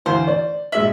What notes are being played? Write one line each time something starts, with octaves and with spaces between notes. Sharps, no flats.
D2 E3 C5 F5
D5
A#1 G#3 E5 F#7